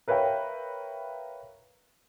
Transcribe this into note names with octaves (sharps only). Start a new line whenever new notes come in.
A#4 B4 C#5 E5 F5 G5